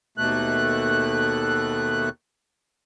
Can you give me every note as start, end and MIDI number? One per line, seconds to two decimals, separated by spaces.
0.18 2.09 39
0.18 2.09 47
0.18 2.09 57
0.18 2.09 90